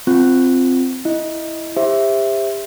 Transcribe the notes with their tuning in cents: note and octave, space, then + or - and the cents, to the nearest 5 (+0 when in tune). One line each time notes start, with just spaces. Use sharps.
C4 -5 F4 +0
E4 +0 D#5 +0
G4 +35 C5 +20 E5 +0